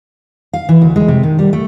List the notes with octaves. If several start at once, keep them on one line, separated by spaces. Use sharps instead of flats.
F5
E3
D2
G#3
C3
D#3
G3
A3